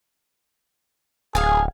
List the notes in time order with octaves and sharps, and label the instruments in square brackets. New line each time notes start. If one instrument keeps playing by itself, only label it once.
[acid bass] D1 [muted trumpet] G#4 [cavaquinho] F5 G#5